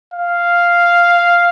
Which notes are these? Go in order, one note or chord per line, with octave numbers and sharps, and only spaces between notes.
F5